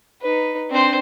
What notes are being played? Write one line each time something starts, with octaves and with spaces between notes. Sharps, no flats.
D#4 B4
C4 D4 C5